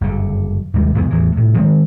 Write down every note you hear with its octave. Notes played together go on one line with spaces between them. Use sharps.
F#1 G2 D3
D#2 G#2 C3 G3
B1 F2 C3 B3
E2 A2 E3
A2 C3
D#3 F3 G#3 C4